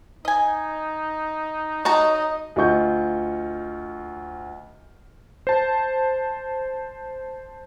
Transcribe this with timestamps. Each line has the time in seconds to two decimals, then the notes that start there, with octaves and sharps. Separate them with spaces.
0.25 D#4 D#5 G#5
1.85 D#4 F#4 C#5 D#5 A5 A#5
2.56 D2 F4 D#5 C#6 G6
5.47 C5 A5